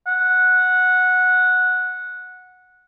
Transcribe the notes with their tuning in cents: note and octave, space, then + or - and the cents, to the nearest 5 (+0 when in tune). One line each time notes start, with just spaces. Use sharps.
F#5 -10